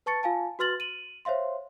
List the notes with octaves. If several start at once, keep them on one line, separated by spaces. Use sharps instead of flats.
B4 A5 C#6 A6 C#7
F4 F5 G#5 A5
F#4 B4 C6 F6 A6 F#7
D#7 F#7
C5 C#5 E5 F5 C6